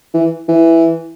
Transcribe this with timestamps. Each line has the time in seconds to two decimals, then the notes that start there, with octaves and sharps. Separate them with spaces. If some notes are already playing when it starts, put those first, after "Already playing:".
0.14 E3
0.48 E3